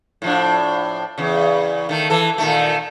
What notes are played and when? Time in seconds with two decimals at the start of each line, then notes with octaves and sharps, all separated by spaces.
0.22 A2 F3 D4
1.18 E2 C#3
1.89 D#3 A3
2.10 E3 A4
2.38 A#2 D#3 A3